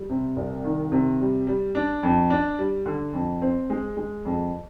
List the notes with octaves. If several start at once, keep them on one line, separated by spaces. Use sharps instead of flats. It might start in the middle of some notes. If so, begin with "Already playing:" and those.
Already playing: G3
C3
C2
D#3
C3
G3
G3
D4
F2
D4
G3
D3
F2
C4
G#3
G#3
F2